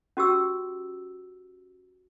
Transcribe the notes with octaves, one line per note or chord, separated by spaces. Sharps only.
C#4 F#4 G4 E6